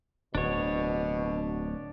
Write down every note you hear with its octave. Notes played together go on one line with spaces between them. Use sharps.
D1 B2 D4 C#5